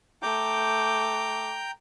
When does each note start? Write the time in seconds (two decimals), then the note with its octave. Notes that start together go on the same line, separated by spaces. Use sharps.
0.22 A3 G5 A#5 D6 G6